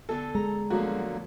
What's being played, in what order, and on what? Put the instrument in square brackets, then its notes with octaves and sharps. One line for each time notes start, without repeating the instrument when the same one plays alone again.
[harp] D3 B3 G#5 [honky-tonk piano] A4
[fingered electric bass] G#3 [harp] A#5
[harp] B2 F3 A3 [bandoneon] D3 F#3 A#3 [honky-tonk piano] F#4